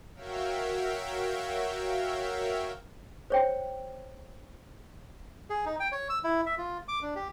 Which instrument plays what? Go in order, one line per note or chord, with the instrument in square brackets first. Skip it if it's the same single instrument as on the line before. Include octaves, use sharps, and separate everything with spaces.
[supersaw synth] F#4 A#4 C#5 E5 F5 G5
[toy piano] C5 C#5 G5
[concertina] G#4
D#4
G5
C#5
E6
E4
E5
F4
D6
D4
G4